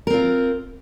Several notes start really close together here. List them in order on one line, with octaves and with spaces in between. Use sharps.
A#4 C4 F4